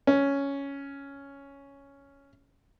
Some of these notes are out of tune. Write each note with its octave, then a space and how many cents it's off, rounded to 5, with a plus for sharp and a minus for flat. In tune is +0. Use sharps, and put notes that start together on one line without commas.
C#4 +5